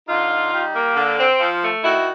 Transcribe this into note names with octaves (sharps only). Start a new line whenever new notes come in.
D3 D#4 F4
D#4
G3
A#3
D3
C4
F3
A3
D#3 E4 F#4